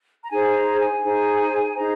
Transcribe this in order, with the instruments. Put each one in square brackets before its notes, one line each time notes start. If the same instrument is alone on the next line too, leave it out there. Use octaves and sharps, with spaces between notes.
[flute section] A#5
D#4 G#4 C5 G#5
A#5
G#5
D#4 G#4 C5
D#4 G#4 C5 A#5